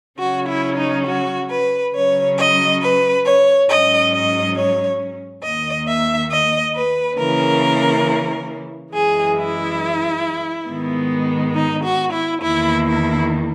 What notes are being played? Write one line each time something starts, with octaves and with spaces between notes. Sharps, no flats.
C#3 F#3 C#4 F#4
E4
D#4
F#4
B4
C#3 F#3 C#4 C#5
D#5
B4
C#5
G#2 F#3 C#4 D#5
D#5
C#5
D#2 D#3 A#3 D#5
E5
D#5
B4
C#3 E3 A#3 C#4 A#4
F#2 E3 G#3 G#4
E4
G#2 D#3 G#3 B3
D#4
F#4
E4
E2 D#3 A#3 E4
E4